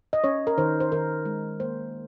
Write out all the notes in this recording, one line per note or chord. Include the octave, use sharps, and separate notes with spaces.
D#5
C#4 C#5
A#4
D#3 C5
C5
D#3 A#4
G#3
A#3 C5